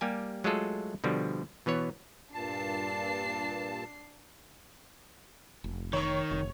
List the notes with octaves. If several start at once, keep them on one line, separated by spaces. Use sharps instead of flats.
G3 A#3 G4 G#5
F#3 G#3 A3 F4 G#4 A4
B2 D3 F3 G3
B2 E3 B3 C#5
G2 A#2 D4 A5 C7
F1
D#3 C#5 C#6
F1